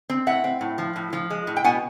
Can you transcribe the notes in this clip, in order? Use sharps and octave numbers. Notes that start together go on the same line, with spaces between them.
C4
A2 E5 F#5
C4
A2
F3
A2
F3
G#3
A2
G5
B2 F#5 G#5